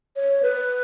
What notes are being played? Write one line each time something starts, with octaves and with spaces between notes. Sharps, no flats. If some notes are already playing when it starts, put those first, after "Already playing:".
C#5
B4